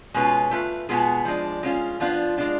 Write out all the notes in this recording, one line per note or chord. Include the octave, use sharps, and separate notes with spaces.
B2 G#3 C#4 F4 B4
A3 F4 B4
B2 G#3 B3 F4 G#4
F3 G#3 D4
G#3 C#4 F4
F3 B3 D4 F4
G#3 D4 F4